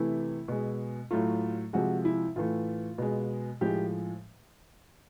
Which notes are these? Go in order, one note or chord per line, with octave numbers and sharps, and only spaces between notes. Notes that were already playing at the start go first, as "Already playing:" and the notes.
Already playing: C3 E3 A3 E4
B2 G#3
A2 F#3 A3 F4
C3 F3 G#3 F#4
E4
A2 E3 A3 F4
B2 G#3
A2 F3 G#3 G4